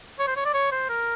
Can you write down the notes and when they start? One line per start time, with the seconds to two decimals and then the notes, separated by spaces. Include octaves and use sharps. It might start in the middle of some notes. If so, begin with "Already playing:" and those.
0.19 C#5
0.27 C5
0.36 C#5
0.45 D5
0.54 C#5
0.72 C5
0.89 A#4